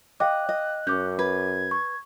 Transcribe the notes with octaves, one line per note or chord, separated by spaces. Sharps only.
D#5 F5 G5 D6 F#6
D#5
F#2 C#4 D6 G6
B4 G#6
C#6